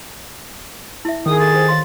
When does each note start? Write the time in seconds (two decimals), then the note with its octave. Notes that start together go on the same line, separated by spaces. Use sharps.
1.05 E4 E5
1.26 D#3 G#4 D#6
1.40 G4 A4 A6
1.52 G4 C5
1.68 C#5 F5 C6